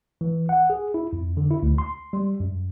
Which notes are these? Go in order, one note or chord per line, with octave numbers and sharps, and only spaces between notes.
E3
F#5
G#4
E4
F2
D3
E4
D2
C6
G3
F#2